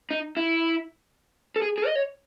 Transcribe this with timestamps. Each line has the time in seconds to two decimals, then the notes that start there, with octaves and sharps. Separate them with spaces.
0.11 D#4
0.37 E4
1.56 A4
1.62 G#4
1.78 G#4
1.86 D#5
1.95 C#5